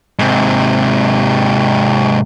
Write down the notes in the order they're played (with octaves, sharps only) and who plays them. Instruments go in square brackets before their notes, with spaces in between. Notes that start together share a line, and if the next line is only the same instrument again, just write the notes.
[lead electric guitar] G#2 C3